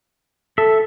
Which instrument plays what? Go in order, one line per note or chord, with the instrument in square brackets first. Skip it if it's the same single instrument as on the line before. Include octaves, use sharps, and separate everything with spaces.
[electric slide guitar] A4 [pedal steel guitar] E5